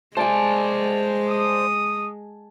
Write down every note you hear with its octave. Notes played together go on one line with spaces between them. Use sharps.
G#3 C5 D5 G#5 A5
D#6